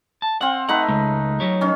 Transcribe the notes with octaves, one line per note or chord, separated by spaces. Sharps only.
A5
C4 F5 F#5
A3 D#4 B4 F#5
C#2 G#3
F#3 G4 C#5
D#3 C#4